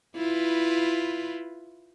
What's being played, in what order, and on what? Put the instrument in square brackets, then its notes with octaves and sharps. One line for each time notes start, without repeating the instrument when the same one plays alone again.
[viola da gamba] E4 F4 B4